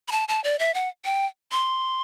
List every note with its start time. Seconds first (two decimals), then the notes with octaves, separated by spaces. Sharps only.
0.08 B5
0.12 A5
0.28 A5
0.44 D5
0.59 E5
0.74 F#5
1.05 G5
1.52 C6